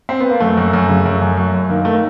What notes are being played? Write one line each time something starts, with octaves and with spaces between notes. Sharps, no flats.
C4
B3
A#3
F#2 A3
F#2
F#2
C#3
F#2
F#2
F#2
F#2
D#3 A#3
D#3 A3
A#3